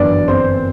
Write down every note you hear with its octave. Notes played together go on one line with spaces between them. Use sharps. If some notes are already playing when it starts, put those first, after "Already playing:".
Already playing: G1 F#2 E3 D4 D5
C4 C5